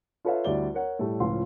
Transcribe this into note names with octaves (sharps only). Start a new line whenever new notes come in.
F4 A4 B4 C#5 E5 F5
D2 G3 E4 D5 G7
A#4 C#5 F#5
A2 G3 A3
C#2 A2 F3 F5 C6